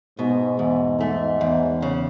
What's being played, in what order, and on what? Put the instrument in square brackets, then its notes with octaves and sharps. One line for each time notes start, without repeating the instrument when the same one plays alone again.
[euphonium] G#2 [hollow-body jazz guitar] B2
[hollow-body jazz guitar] E2 [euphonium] G#2
[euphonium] G#2 [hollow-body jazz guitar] A3
[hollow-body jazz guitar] E2
C#3